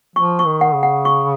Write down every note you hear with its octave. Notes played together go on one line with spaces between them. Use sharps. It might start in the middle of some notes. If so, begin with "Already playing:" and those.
F3 C#6
C#6
D#3
F#5
C#3
F#5
C#6